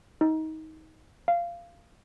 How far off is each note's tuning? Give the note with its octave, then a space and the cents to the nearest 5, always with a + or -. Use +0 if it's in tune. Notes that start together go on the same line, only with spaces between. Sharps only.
D#4 +25
F5 -15